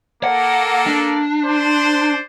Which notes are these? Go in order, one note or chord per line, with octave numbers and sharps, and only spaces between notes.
A#3 A4 F#5
D4
C5 D5